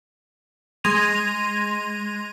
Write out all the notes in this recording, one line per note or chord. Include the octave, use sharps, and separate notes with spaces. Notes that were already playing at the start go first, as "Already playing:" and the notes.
G#3 C6 G#6 A#6 D#7 F7